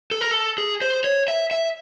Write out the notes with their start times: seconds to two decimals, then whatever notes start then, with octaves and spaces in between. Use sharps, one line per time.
0.11 A4
0.21 A#4
0.31 A4
0.58 G#4
0.81 C5
1.04 C#5
1.28 E5
1.51 E5